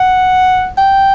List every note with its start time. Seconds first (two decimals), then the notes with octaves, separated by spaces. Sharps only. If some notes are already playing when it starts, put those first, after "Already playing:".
Already playing: F#5
0.78 G5